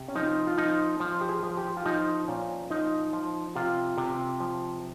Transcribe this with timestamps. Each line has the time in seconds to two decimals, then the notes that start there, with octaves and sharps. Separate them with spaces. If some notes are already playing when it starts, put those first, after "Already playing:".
Already playing: C3
0.08 C#4
0.15 F3 D#4
0.47 F4
0.58 F3 D#4
1.00 F3
1.21 G4
1.29 G#4
1.43 F3
1.57 G4
1.77 F4
1.86 F3 D#4
2.28 A#2 C#4
2.70 F3 D#4
3.13 F3
3.55 C3 F4
3.98 C3
4.40 F3